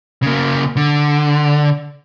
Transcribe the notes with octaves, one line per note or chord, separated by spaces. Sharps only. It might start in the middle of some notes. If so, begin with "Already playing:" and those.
C#3 A#3
D3